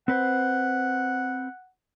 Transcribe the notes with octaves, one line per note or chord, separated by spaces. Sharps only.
C4 B4 C5 F#5